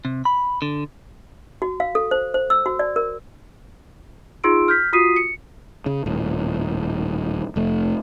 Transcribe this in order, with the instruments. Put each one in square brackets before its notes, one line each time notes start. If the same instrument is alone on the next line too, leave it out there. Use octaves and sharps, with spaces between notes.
[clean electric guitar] C3
B5
D3
[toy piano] F#4
F5
A4
C5
C5
E6
F#4
D5
A#4
[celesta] D#4 F4 G#4 C6 E6 D7
F6 G6 B6
F4 F#4 D#6 B6 C7 D#7
C#7
[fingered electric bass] C#3
D#1 A2
F1 A3